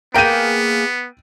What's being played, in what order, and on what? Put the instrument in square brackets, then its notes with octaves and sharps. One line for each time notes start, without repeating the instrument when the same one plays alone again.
[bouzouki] A#3 G#4 [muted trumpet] B3 [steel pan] G5 A#5 [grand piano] D7 D#7